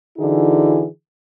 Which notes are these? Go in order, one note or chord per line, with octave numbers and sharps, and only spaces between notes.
D3 E3 D#4 E4 F#4 G#4